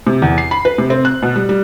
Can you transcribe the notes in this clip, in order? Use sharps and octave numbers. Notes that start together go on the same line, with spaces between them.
C3
E2
C7
B5
B4
C3
C4
F#6
B2
G3
G3